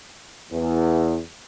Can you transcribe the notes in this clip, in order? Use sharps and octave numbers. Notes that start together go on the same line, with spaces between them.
E2